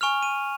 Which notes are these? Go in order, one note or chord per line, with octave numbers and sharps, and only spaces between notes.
G#5 C#6 F6 F7
D#7